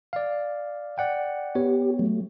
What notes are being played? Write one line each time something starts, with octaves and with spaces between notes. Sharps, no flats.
D5 F5
D5 F#5 G5
B3 G4 C#5
F#3 A3